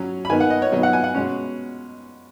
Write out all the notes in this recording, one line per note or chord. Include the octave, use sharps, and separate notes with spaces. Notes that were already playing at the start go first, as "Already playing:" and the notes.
Already playing: F#3 C#4
B5
D#3 B3 D#4 G#5
F#5
D#5
C#5
B2 F#3 B3 D#4 D#5
F#5
G#5
F#5
B2 G#3 C#4